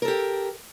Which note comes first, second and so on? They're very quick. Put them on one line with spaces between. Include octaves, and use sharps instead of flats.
A#4 A4 G4